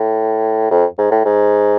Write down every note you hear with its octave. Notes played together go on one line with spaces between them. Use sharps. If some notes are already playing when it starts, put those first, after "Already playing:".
Already playing: A2
F2
G#2
A2
G#2